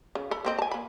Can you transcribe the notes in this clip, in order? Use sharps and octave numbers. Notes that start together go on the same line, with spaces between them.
C#3
A4 B5
A#3 C4 D#5
G#5 A5
A#3 B5